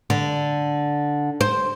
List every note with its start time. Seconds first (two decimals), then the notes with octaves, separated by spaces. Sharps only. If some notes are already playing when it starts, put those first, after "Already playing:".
0.10 D3
1.41 C5